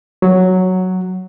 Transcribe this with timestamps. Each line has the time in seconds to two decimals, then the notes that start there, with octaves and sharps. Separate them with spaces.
0.22 F#3